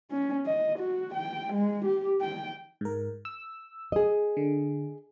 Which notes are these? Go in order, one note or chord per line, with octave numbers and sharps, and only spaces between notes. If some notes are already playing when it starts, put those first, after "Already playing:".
C#4
D#5
F#4
G5
G#3
G4
G5
G#2 A#4
E6
G#4 D#5
D3